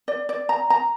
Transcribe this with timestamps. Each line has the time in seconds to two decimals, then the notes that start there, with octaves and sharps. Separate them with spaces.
0.08 D5
0.29 D5
0.49 A#5
0.70 A#5